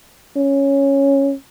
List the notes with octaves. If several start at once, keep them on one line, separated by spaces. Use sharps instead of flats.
C#4